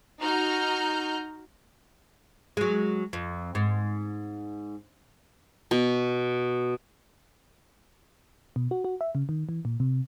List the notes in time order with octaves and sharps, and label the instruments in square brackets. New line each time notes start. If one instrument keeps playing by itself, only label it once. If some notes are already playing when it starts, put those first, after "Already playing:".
[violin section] D#4 F#4 A#5 F6 G6
[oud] F#3 G#3
F2
G#2
[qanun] B2
[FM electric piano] B2
F#4
F#4
E5
C#3
D#3
E3
A#2
C3